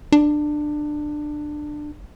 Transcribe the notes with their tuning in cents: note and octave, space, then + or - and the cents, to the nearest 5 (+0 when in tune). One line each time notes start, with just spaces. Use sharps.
D4 +20